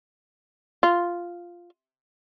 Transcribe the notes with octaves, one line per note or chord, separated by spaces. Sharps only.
F4